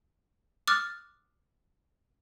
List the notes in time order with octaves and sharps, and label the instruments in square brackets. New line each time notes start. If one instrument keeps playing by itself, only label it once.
[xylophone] D6 D#6 F6 F#6 A6